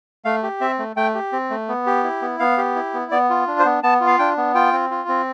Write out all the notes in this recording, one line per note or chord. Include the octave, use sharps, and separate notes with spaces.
A3 F5
G4
C4 E5
A3
A3 G5
G4
C4
A3
B3
G4
E4
B3
B3 F5
G4
E4
B3
B3 D5
F4
D4
C5
B3
B3 A5
F4
F5
D4 G5
B3
F4 G5
C4
F4
C4